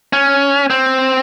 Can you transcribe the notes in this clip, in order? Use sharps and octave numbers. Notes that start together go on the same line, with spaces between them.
C#4
C4